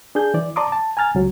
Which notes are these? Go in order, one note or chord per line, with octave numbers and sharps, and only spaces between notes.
D4 G#4 G6
E3 D5
D5 A5 A#5 C6 D6 D#6
A5
G#5 A#5 F6 A6
C#2 F#3